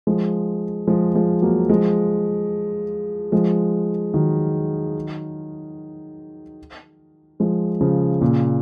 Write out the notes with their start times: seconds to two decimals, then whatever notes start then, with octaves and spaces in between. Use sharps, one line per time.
0.07 F3 G#3
0.88 F3 G#3
1.15 F3 G#3
1.42 F#3 A#3
1.70 F3 G#3
3.32 F3 G#3
4.14 D#3 F#3
7.40 F3 G#3
7.81 C#3 F3
8.21 A#2 C#3